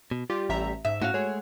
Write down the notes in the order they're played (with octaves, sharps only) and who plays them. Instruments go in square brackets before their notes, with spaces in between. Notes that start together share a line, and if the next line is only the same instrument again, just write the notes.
[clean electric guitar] B2
[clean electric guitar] G3 [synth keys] F4 G4
[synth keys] A1 E5 A#5
[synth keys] G#2 [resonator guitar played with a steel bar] E5
[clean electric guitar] A2 C#4 F5 [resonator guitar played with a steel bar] F#4
[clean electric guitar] G#3 A3 G#4 [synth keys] C#5